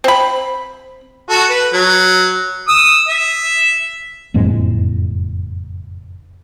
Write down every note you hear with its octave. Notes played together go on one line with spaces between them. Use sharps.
C4 B5
F#4 A4
B4
F#3
D#6 E6
E5
F#1 F2 A2 G#3